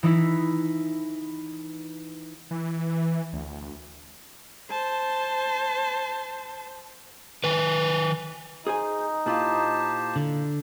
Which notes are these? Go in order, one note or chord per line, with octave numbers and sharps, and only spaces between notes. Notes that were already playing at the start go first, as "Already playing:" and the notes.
E3 D#4 E4
E3
D2
C5 A5
D#3 B4
D#4 G#4 C5 G#5
A#2 E4 F4 G4 C5 A5
D3